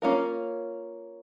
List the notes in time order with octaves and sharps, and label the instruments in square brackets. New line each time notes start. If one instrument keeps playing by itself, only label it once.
[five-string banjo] A#3 C#4 F4 A#4